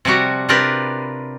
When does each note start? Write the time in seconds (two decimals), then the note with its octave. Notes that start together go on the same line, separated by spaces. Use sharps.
0.05 C3 F3 G3 F#4
0.49 C3 D4 F4 G4 A#4 B4